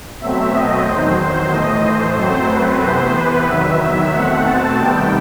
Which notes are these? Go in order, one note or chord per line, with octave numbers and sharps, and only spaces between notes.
B2 F#3 A3 C4 E5
D#5
E2 D#3 F#3 C5
C5
A2 E3 A3 D#5
C5
F#2 F#3 A3 C4
B4
C3 E3 B3 C5
B4
E2 D#3 F#3 E5
E5
B2 A3 C4 F#5
A5
C3 D#3 G3 B3 G5